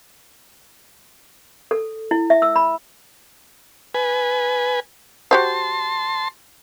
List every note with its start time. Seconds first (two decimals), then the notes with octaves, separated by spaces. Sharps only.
1.71 A4
2.11 E4
2.30 E5
2.42 E6
2.56 B5
3.94 B4 G#5
5.31 F#4 G4 C5 A5 C6